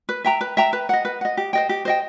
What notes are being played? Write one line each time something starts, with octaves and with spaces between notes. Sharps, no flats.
B4
E5 G5 A#5
B4
E5 G5 A#5
B4
D#5 F#5
B4
D#5 F#5
G4
C5 D#5 G5
G4
C5 D#5 G5